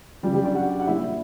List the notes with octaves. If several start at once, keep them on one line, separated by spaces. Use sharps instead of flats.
C#3 F#3 G3 G4
G3 G4
D4 D5
F#4 F#5
F#5
A#2 G3 E4 E5